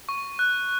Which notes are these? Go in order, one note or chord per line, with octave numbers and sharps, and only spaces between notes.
C#6
F#6